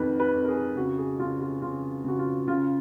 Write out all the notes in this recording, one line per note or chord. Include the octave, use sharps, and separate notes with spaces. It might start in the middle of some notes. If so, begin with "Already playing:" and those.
Already playing: F2 D#3 B4
B4
F2
A#4
G#4
C#3 F#4
G#4
C#3 F4
F4
C#3 F4
C#3 F#4
F4
C#3 F4